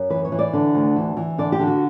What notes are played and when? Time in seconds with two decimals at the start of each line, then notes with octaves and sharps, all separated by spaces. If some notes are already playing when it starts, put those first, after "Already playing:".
Already playing: F#2
0.10 E3 B4
0.25 C#5
0.32 E3
0.39 D5
0.53 D3
0.75 D2
0.96 E3
1.17 E3
1.38 D3 D5
1.52 G4
1.59 D3
1.67 F#4